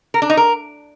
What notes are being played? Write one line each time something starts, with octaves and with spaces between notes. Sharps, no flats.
A#4
D4
D#4
A#4